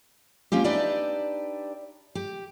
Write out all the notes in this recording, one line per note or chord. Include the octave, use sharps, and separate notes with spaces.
A#3 C#4 F4 G4
D4 D#4 G4 B4 D5 E5
G4